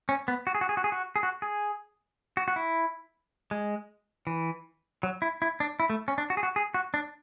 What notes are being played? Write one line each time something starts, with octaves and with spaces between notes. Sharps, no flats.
C#4
B3
F#4
G#4
F#4
G#4
F#4
G#4
F#4
G#4
F#4
G#4
F#4
F#4
E4
G#3
E3
F#3
E4
E4
D4
E4
A3
C#4
D4
F#4
G#4
F#4
G#4
F#4
D4